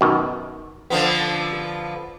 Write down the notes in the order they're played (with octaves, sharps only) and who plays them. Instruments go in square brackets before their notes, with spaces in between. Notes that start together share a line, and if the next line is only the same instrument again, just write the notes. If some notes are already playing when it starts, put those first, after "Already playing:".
[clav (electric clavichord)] F#2 B2 D#3
[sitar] D3 F3 B3